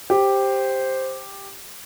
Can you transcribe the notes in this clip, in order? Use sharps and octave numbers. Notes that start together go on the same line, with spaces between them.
G4 C5